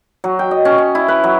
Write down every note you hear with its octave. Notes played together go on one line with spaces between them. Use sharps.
F#3
G5
D#5
C#4
C#4
E4
B4
F#3